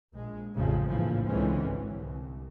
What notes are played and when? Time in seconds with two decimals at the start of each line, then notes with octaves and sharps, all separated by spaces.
0.13 A#1 G#3
0.54 A1 F2 C#3 F3 G#3
0.88 A#1 F2 A2 C#3 E3 F3
1.27 C#2 D3 E3 G#3 C4 C#4
1.64 G#1
1.96 C2